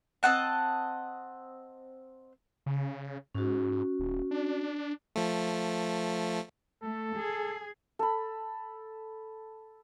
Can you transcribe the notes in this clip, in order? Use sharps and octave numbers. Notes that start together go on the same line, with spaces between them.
C4 D#5 F#5 A5
C#3
G#2 C#4 F#4
D#1
D4
F3 A3
A3 A4
G#4
A4 B5